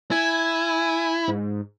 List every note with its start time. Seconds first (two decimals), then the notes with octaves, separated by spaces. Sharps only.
0.11 E4 G#5
1.28 G#2